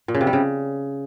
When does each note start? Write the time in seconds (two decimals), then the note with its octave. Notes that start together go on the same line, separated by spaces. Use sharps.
0.08 A#2
0.15 C#3
0.21 C3
0.27 G3
0.33 C#3